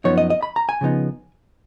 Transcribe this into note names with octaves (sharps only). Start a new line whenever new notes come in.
F#2 F3 B3 D#4 C#5
D#5
D#5
B5
A#5
G#5
C#3 F3 B3 D#4